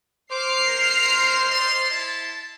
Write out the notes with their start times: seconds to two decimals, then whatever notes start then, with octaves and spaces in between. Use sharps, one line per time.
0.31 C5 D6 F6 C7
0.66 G#3 A#4
1.50 D5 D#5 C6
1.90 E4 A5